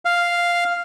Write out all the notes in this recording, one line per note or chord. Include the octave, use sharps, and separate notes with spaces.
F5